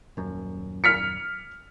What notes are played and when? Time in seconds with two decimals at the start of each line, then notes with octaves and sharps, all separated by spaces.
0.17 D#1 F#2
0.84 F6 B6 C#7